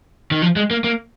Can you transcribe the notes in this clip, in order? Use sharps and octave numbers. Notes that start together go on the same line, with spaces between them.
D#3
F3
G#3
A#3
A#3